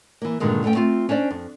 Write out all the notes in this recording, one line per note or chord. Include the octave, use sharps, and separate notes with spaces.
E3 A#3
G2 A#2 D3 D#3 G#3
G2 E3 A3 C#4 G5
A3 C4 F4
C#4 D4 C5 D5
F2